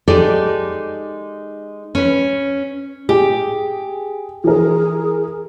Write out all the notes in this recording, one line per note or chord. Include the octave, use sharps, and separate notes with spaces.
G#3 D#4 G4 A4 D5
C#4 B4
G4 G#4
E3 G#4 A#4